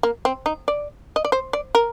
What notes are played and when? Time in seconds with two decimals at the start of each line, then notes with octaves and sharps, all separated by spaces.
0.03 A#3
0.25 C4
0.46 D#4
0.68 D5
1.16 D#5
1.25 D5
1.32 C5
1.53 D5
1.75 A#4